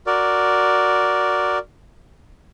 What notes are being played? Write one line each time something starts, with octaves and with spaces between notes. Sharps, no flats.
F#4 A#4 D5